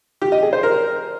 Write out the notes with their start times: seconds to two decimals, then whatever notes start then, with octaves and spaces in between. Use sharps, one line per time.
0.22 G4
0.32 D#5
0.42 G#4
0.53 C5
0.63 A#4